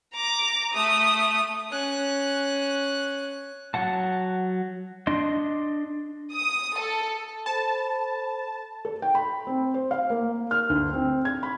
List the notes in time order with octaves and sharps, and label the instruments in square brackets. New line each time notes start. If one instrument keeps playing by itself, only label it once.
[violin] A#5 D6
A3 D#6
[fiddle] C#4 F#6
[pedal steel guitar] F#3 F#5 A5
D4 D#5 C6
[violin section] D#6
A4
[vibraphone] A4 C5 B5 [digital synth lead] A5
[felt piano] A4
G5
B5
C4
C5
F5
A#3
F6
D2
C4
G#6
B5